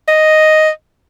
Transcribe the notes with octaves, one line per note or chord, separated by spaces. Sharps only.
D#5